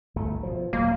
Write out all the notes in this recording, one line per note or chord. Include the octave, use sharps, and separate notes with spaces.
G1 D2 A3
B2 F3
D#1 F#3 G#3 A#3